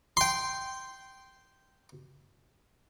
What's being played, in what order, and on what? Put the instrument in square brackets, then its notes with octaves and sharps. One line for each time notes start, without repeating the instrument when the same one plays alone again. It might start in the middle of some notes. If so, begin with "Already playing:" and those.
[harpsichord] G5 C6